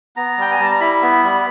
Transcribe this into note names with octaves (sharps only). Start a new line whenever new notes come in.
B3 A#5
G3 G5
G#5
G3 A5
A#5
E4 B5
B3
G3